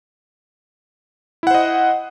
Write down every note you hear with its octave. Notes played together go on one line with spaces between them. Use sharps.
E4 C5 D#5 F#5